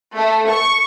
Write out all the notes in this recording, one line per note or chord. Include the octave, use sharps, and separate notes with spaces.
A3
C#6